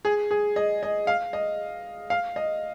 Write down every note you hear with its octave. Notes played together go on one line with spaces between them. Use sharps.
G#4
G#4
D#5
D#5
F5
D#5
F5
D#5